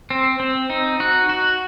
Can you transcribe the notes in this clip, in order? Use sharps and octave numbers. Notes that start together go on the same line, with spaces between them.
C4
C4
D#4
F#4
F#4